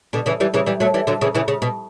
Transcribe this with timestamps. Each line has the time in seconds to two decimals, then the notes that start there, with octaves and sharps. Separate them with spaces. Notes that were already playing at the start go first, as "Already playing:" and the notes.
0.13 B2 D3
0.26 C#3 E3
0.40 E3 G3
0.54 C#3 E3
0.66 E3 G3
0.80 F#3 A3
0.94 E3 G3
1.07 D3 F#3
1.21 C#3 E3
1.35 C#3 E3
1.48 C#3
1.62 B2